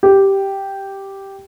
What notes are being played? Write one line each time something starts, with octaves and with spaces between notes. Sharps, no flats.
G4